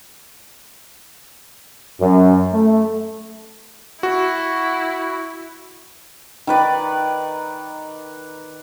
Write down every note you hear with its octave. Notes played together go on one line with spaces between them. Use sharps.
F#2
A3
E4 F#4
D#3 B4 D5